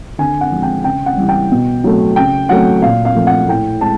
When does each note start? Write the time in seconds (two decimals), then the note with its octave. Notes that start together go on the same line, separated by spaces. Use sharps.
0.18 D3 G#5
0.41 F#5
0.52 F3 G#3
0.63 G5
0.84 C#3 G5
1.06 F#5
1.17 E3 G3
1.29 G5
1.51 B2
1.84 F#3 A3
2.16 C#3 G5
2.49 F#3 A3 F#5
2.82 A#2 F5
3.05 F5
3.15 F3 A3
3.27 F#5
3.48 A2 G5
3.81 G#3 A5